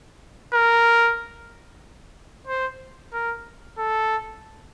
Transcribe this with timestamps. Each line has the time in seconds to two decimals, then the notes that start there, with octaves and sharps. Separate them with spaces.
0.54 A#4
2.47 C5
3.13 A#4
3.78 A4